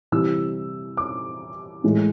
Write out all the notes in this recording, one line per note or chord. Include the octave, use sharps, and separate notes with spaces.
C3 E3 G3 E6
D6
A2 E3 G#3